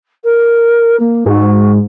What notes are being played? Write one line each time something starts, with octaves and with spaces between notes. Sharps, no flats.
A#4
A#3
G#2 F#4